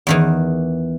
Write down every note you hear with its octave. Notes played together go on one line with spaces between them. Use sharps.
E2 D#3 E3